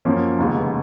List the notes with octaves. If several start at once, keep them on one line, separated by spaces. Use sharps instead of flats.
F#2 F3 A#3 C#4
F1 D#2 C#3 G#3 B3